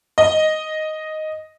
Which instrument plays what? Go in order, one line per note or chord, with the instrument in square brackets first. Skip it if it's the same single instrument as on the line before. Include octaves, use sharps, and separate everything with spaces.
[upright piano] D#5